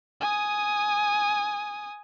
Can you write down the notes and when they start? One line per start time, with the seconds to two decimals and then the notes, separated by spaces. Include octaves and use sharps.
0.21 G#5 D#6